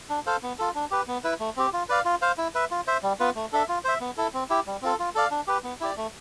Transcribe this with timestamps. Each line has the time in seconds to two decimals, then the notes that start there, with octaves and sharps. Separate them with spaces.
0.10 D4
0.26 A4 C5 F5
0.43 B3
0.59 F4 A4
0.75 D4
0.91 G4 B4
1.08 B3
1.24 E4 B4
1.40 A3
1.56 C4 G4
1.73 F4
1.89 B4 D5 F5
2.05 F4
2.22 C5 F5
2.38 E4
2.55 B4 E5
2.71 F4
2.87 C5 E5
3.03 G3
3.20 B3 F4 B4
3.36 A3
3.53 D4 A4 E5
3.69 F4
3.84 C5 E5
4.01 B3
4.17 E4 A4
4.34 C4
4.50 E4 G4
4.67 G3
4.82 C4 F4 A4
5.00 F4
5.15 A4 D5 F5
5.31 D4
5.47 G4 B4
5.64 B3
5.81 E4 G4 D5
5.97 A3